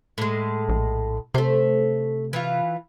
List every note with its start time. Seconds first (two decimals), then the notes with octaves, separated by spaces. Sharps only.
0.18 A2 G#3
0.69 A#1
1.34 C3 A3 C5
2.33 E3 F4